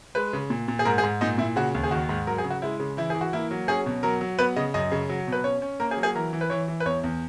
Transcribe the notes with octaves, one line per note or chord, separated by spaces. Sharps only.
G#3 B4
C#3
A#2
A#2
G#4
G#2 A#4
G#4
G#2
A#2 D#4
A#2 E4
C#3 F#4
D#2
G#4
D#3 F#4
G#2
F#3 A#4
G#4
C#3
F#4
G#3 E4
C#3
E3 E4
E3 G#4
F#4
A#3 E4
F#3
C#4 G#4
B2
F#3 A#4
F#3
B3 B4
C#3 D#5
F#2 D#5
C#3
F#3
B2
B4
C#4 C#5
C#4
A#3 A#4
G#4
F#3
G#4
E3 A#4
E3
B4
E3 C#5
E3
B4
E2 C#5
E2